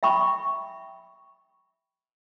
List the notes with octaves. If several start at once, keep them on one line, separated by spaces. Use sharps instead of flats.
E5 G5 B5 C#6